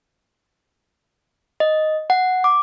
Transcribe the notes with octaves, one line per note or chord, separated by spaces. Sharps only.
D#5
F#5
D6